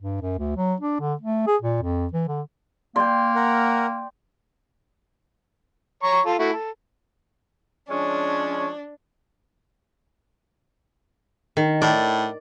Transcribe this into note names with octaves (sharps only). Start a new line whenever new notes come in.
G2
F#2
D2
F#3
D4
D3
A3
G#4
A#2
F2
E3
D3
A#3 D5 G5 C6
A#4 F#5
C#5 A#5 C#6
F4 A4
A3 E4 F#4
A4
F3 G#3 C#4 D4
D#3
A2 D5